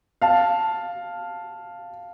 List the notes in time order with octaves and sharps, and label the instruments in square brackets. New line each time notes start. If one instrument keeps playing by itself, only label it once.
[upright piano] F5 A5